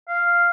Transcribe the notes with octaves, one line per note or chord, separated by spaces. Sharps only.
F5